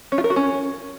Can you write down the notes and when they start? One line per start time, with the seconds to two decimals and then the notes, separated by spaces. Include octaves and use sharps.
0.12 C#4
0.18 F4
0.24 A#4
0.30 F#4
0.36 C#4